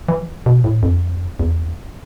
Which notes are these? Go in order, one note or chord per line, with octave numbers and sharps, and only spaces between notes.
E3
B2
A2
F2
E2